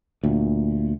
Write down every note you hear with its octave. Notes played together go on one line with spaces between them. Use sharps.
D2 A#2